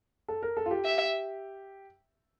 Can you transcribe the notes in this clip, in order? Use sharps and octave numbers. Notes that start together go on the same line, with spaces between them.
A4
A#4
A4
F4
G4
E5